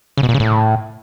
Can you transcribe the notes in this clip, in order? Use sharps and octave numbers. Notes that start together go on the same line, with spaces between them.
C#3
B2
A#2
C#3
A2